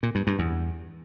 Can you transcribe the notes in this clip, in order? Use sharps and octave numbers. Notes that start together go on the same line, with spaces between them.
A#2
G2
G2
E2